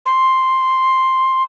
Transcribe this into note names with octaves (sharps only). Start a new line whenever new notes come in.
C6